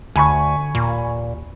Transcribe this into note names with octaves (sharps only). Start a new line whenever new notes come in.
D2 D3 G#5 B5 C#6
D#2 A#2